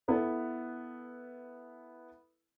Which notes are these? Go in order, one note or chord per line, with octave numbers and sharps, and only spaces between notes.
B3 E4 A4 B4